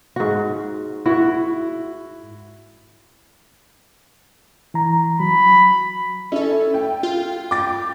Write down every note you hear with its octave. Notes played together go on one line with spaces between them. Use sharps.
G#2 F#4
E4 F#4
E3 A#5
F#3 B5
C#4 E4 A4
G5
F4
G5 D6 A6